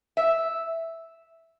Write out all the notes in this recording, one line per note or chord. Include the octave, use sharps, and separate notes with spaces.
E5